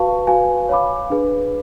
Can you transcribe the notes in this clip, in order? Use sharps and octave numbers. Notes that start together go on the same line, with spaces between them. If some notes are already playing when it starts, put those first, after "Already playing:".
Already playing: F#4 B4 F5 A5 C#6
F#4 B4 F5 G#5
C#5 F5 B5 D6
D4 G#4 B4